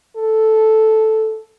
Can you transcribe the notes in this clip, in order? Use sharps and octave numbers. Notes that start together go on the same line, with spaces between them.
A4